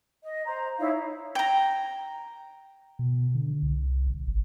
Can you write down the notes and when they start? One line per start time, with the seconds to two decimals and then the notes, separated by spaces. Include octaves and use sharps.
0.21 D#5
0.45 C5 A#5
0.78 D#4 E4 C#5 F5
1.35 G5 A#5
2.99 B2
3.35 D3
3.63 C2
4.07 A#1
4.28 G#1